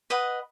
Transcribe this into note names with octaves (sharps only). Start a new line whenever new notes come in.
B4 D#5 F#5